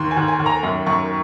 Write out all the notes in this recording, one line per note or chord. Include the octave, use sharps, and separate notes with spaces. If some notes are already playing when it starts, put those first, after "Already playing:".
Already playing: D#2 C6
G#5
D#2
G#5
D#2
A#5
F#2
F#2 C#6